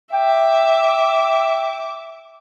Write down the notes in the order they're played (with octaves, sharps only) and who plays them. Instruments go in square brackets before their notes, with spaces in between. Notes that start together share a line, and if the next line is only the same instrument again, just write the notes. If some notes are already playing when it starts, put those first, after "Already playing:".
[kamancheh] E5 D6 [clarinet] G5